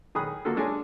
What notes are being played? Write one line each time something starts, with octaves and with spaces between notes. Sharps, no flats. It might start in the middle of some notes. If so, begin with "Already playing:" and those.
D#3 G#4 B5 D#6 F#6
D3 A#3 F4 F#4 A4
G#3 D4 G#4 C#5 G#5